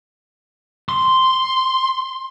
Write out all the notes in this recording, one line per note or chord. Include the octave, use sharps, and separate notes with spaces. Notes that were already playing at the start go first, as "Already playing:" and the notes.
C6